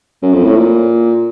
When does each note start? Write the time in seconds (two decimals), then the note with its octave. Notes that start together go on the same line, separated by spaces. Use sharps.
0.22 F#2
0.34 F2
0.45 A2
0.56 A#2